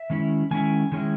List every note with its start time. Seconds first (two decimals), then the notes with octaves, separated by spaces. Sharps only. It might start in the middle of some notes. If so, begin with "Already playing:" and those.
Already playing: E5
0.10 D#3 G#3 C#4 E4
0.51 D#3 G#3 C#4 E4 G#5
0.92 D#3 G#3 C#4 E4